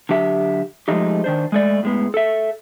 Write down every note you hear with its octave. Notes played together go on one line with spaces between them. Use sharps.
D3 F#3 G4 E5
F3 G#3 A3 D#4 G4
D#3 D4 C5
G#3 A3 D5
A2 G#3 B3
A4 E5